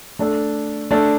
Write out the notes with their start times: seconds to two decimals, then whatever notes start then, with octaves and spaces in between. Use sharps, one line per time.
0.19 A3 D4 A4
0.91 A3 D4 A4